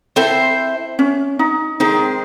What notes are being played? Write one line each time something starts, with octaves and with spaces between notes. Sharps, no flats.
C4 E4 A4 C5 E5
C#4
D#4
D#3 G#3 C4 D#4